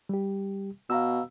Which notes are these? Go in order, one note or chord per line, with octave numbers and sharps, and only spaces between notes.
G3 G4
B2 F5 A#5 E6